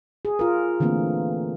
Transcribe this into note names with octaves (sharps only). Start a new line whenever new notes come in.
G#4
F4 A#4
D3 E3 A3 A#3 C4